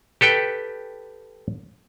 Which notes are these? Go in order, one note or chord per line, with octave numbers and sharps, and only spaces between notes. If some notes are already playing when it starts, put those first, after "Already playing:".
G4 A4 B4 G5